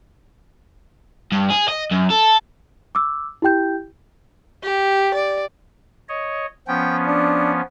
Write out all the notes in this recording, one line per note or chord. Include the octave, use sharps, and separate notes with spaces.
G2
G#4
D#5
F#2
A4
D6 E6
E4 G4 G5 G6
G4
D5
C#5 D#5
F3 B3 C#4 G5
D4